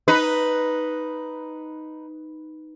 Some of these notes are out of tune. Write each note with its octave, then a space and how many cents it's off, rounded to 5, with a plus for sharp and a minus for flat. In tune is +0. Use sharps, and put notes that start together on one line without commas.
D#4 +0 B4 +0